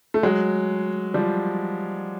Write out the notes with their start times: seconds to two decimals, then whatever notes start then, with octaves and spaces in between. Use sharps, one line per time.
0.14 A3
0.23 F#3 G#3
1.14 F3 G3